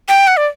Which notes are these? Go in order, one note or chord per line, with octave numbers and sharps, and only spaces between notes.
G5
F#5
D5